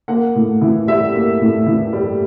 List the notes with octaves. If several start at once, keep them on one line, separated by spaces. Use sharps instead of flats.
A#3 F#5
A2
E3
G3 E5
A#3
A2
E3
G3